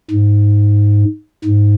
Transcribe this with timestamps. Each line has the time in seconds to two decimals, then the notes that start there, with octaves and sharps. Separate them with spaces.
0.11 G#2
1.45 G#2